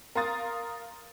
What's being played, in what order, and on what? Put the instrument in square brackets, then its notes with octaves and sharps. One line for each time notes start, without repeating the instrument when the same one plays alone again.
[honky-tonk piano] A#4 F5 A#5 C6 D#6 A6